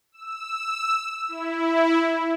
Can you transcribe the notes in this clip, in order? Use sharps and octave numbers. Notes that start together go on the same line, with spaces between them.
E6
E4